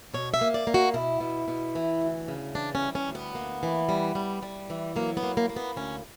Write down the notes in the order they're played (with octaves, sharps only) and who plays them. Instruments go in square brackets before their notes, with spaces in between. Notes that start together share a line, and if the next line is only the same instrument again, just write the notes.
[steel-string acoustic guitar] B2 C#5
E5
A#3
D5
A#3
F#4
B2 E4
B2
B2
E3
D2
C#3
E3 D4
C#4
G3
C#4
D2
B3
A#3
E3
G3
G3
G3
E3
F#3 A#3
B3
A#3
A#3
A#3
B3
D2 C#4